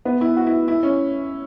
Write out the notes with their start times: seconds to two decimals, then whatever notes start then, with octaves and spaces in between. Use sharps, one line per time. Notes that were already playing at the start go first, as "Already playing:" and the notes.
0.05 B3
0.21 E4
0.37 F#4
0.47 E4
0.68 E4
0.83 C#4